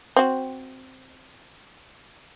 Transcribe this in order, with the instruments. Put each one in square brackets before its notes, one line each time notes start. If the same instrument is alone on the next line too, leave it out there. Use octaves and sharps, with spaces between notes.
[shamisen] C4 F#4